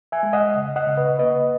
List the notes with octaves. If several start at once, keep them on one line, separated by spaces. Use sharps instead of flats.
E5 G#5
G#3
D#5 F#5
C#3
D#5 F#5
C#3
B4 D#5
A#3 B4 D#5